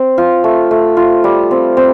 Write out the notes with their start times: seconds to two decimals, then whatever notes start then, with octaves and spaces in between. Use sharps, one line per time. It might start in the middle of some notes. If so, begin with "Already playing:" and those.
Already playing: C4
0.18 F4
0.44 A3
0.71 A3
0.97 F4
1.24 G3
1.51 C4
1.77 C4